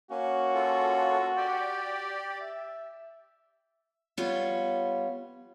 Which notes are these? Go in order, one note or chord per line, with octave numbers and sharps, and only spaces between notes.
A#3 C#4 F#4
F4 A4
G4 D5 G5
E5
G3 B3 F4 C#5